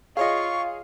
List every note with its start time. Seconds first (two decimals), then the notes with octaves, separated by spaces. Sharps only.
0.17 F4 G#4 C#5 D#5 F5 C#6